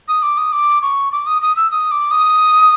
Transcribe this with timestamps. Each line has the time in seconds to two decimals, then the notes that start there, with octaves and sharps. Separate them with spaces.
0.08 D#6
0.23 D6
0.38 D#6
0.52 D6
0.82 C#6
1.12 D6
1.26 D#6
1.42 D#6
1.57 E6
1.71 D#6
1.91 D6
2.11 D#6